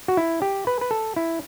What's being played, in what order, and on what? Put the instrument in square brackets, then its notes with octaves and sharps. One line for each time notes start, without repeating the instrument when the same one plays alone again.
[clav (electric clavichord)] F#4
E4
G4
B4
B4
A4
E4